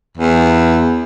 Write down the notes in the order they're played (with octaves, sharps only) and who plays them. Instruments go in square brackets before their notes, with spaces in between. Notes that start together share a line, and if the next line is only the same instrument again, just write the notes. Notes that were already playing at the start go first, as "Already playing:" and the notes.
[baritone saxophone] E2